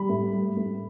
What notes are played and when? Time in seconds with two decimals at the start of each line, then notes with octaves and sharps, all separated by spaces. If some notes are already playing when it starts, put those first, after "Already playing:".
Already playing: G3 B5
0.09 A2
0.33 G3
0.56 A2